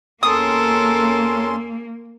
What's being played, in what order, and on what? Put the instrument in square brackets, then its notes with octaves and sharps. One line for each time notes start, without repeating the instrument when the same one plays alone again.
[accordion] E2 C#4 C6 [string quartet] A#3 [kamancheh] A4 A#4 [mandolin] D#6